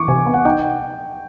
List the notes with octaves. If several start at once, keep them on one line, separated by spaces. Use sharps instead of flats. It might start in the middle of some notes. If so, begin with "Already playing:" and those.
Already playing: E3 C#6 D6
C3 G#5
B3
F#5
D#4 G5